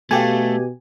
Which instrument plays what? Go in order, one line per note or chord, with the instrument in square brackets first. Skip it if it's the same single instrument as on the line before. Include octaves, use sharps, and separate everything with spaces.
[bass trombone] B2 [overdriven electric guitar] A3 [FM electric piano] G4 G#5 [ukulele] A4 F5